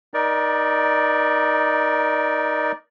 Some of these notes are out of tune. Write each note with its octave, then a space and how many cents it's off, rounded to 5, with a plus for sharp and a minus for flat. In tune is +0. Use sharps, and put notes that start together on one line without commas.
D#4 +0 A#4 +30 D5 +0